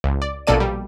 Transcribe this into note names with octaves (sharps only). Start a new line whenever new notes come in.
C#2
D5
A#1 B2 A#3 A4 D5 D#7
G3